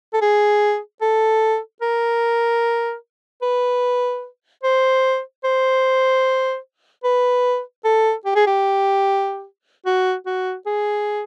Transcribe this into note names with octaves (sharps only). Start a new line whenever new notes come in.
A4
G#4
A4
A#4
B4
C5
C5
B4
A4
G4
G#4
G4
F#4
F#4
G#4